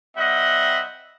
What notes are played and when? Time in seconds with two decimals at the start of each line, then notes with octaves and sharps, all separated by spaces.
0.16 G3 C4 D#5 E5 F#5